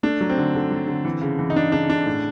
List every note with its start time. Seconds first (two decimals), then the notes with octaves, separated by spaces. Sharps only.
0.03 A3 D4
0.21 F#3
0.29 C4
0.38 D3
0.55 D3
0.71 F#3
0.88 D3
1.05 E3
1.21 C#3
1.39 E3
1.50 D#4
1.56 C#3 D4
1.72 C#3 D4
1.89 C#3 D4
2.06 A2